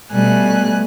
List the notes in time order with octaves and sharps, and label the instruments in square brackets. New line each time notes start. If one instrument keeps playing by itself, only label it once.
[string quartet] B2 G3 A3 G#5 F#6